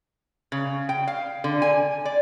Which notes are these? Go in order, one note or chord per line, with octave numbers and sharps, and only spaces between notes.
C#3
G5
F5
D3
G#5
D5